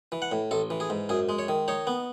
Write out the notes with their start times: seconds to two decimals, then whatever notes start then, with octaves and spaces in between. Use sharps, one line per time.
0.12 E3
0.22 F#5
0.32 A2
0.51 A1 A4
0.70 E3
0.80 G#4
0.90 G#2
1.09 F#2 G#4
1.29 G#3
1.39 C#5
1.48 D#3
1.68 D#4 C#5
1.87 B3